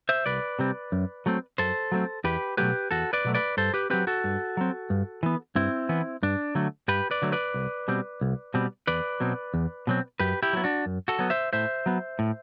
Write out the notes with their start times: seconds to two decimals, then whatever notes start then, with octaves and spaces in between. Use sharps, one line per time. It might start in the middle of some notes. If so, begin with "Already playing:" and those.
0.09 C5 E5
0.26 C2 B4 D5
0.59 C3 G3 C4
0.92 F#2
1.26 F#3 A3 C4
1.58 F#2 A4 C5
1.92 F#3 A3 C4
2.24 E2 G4 B4
2.57 B2 F#3 A3 G4 B4
2.91 E2 F#4 A4
3.13 B4 D5
3.25 B2 F#3 A3
3.35 B4 D5
3.57 G2 A4 C5
3.74 G4 B4
3.90 F#3 C4 G4 B4
4.07 F#4 A4
4.24 G2
4.57 F#3 C4
4.90 G2
5.23 E3 B3
5.55 G2 C4 E4
5.89 E3 B3
6.23 G2 D4
6.55 D3 F#3 A3
6.88 G2 G4 B4
7.11 B4 D5
7.22 D3 F#3 A3
7.32 B4 D5
7.54 C2
7.88 B2 G3 C4
8.21 C2
8.54 B2 G3 C4
8.87 E2 B4 D5
9.20 B2 F#3 C4
9.54 E2
9.87 B2 F#3 C4
10.20 F#2 G4 B4
10.43 E4 G4
10.53 F#3 B3
10.64 D4 F#4
10.86 F#2
11.08 F#4 A4
11.19 F#3 B3
11.30 C5 E5
11.53 A2 C5 E5
11.86 F#3 B3
12.19 A2